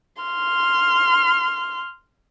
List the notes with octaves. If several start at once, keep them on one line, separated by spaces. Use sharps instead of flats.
C6 F6